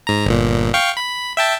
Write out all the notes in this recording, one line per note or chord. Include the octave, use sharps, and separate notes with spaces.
G#2 A#5
G1 A#2
F5 G5 C#6
B5
E5 G5 A5